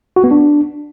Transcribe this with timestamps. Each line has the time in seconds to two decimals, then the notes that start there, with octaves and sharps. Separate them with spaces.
0.16 F#4
0.24 B3
0.31 D4